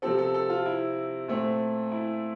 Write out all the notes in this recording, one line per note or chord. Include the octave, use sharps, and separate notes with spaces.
C3 F3 C4 A4
A4
A4
F4
E4
A#2 A3 C4
E4